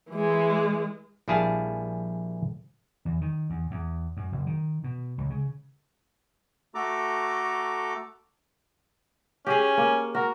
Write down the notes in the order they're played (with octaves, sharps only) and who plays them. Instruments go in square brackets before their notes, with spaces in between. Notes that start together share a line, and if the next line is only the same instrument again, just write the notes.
[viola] E3 G#3
[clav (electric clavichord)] A#1 G3 E4 G#4 F5 A5
[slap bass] E2
D#3
E2
E2
F#2
F#1
D#3
B2
C#2
C#3
[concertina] A3 F#4 A4 A#5 D6
[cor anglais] C#4 [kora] G4 G#4
[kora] A#3
[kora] F#4 [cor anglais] A#4